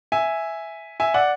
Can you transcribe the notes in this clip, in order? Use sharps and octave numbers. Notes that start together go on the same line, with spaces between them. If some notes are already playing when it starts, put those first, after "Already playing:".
E5 G#5
E5 G#5
D5 F#5